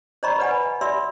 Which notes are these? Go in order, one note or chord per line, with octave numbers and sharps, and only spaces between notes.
C5 D5 D#5 A#5 B5 C#6
B4 D5 F#5 G#5 B5
G#5
D5 E5 B5 C6 E6